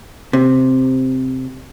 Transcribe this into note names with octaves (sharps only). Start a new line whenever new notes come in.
C3